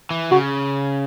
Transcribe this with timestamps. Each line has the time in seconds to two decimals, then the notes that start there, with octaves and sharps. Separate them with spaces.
0.11 E3
0.31 C#3 F#4